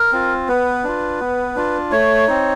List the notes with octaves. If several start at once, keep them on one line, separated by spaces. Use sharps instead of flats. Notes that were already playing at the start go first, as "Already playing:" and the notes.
Already playing: A#4
C4 F4
B3 B4
D4 F4
B3
D4 F4
A3 C#5
C4 D#4